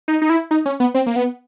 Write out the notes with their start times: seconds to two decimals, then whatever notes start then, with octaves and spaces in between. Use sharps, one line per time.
0.08 D#4
0.22 D#4
0.30 E4
0.51 D#4
0.66 C#4
0.80 B3
0.94 C4
1.07 A#3
1.16 B3